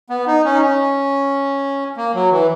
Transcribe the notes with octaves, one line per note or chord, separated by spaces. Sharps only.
B3
D#4
C#4
D#4
C#4
A#3
F#3
E3